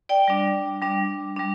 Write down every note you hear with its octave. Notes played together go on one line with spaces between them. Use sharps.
D5 G5
G3 D4
G3 D4
G3 D4